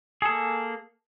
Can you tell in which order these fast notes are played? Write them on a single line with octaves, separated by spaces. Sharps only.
G#4 A4 A#3